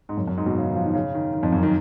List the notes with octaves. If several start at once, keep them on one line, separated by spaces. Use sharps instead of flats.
G#2
F#2
F#2
G#2
B2
C#3
D#3
F3
D#3
C#3
D#3
D#3
F2
F#2
D#3